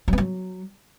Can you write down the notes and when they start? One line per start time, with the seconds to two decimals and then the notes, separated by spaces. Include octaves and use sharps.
0.08 F#3
0.13 B3
0.18 F#3